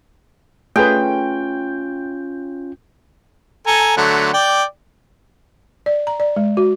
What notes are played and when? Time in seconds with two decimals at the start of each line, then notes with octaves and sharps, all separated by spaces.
0.76 A3 C#4 F4 G#4 B4 G5
3.67 A4 G#5 A#5
3.97 D3 F#3 A3
4.34 D5 G5
5.86 D5
6.07 A#5
6.20 D5
6.36 G#3
6.57 F#4